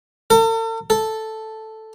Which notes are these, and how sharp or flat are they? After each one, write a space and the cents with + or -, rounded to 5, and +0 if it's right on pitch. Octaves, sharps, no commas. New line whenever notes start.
A4 +45
A4 +0